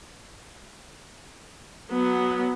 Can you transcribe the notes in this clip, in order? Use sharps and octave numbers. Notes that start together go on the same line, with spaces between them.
F#3 B3